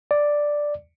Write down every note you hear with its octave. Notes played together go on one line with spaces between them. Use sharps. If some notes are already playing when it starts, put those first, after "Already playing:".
D5